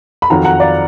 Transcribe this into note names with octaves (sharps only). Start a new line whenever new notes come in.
B5
F2 D#3 F#3 F#5 A#5
F#5 A#5
D5 F5